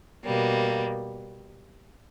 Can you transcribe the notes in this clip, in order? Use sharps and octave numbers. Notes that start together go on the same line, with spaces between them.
B2 G3 A#3